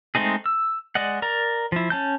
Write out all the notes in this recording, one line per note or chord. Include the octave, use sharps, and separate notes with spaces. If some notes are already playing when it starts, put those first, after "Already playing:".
G#3 A3 C4 D#4 G#4
E6
G#3 D5 D#5 F#5
A#4 D5 A#5
F3 E4
C#4 A5 G6